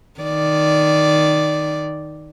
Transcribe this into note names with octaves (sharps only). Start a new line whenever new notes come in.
D#3 D5